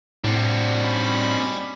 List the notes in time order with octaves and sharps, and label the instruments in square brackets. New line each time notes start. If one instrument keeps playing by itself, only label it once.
[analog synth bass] A2 [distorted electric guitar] G3 F#4 [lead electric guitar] C4 D4
[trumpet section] C#4 D#4 B5